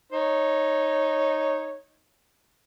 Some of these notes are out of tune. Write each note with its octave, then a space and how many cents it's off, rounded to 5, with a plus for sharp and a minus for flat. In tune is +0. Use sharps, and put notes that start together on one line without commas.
D#4 +0 C#5 -10